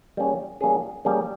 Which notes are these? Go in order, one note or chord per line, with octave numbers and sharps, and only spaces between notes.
G3 A#3 C#4 G#4
G3 A#3 C#4 G#4
G3 A#3 C#4 G#4